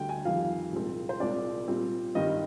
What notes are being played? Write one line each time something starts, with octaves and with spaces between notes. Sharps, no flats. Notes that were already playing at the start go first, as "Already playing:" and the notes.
Already playing: D2 D3 G3 G5
G#5
F2 D#3 G3 F5
C2 A#2 F3 G#3 C4
C5
C2 A#2 G#3 C4 D5
A#2 G3 C4
G2 D#3 G3 C4 D#5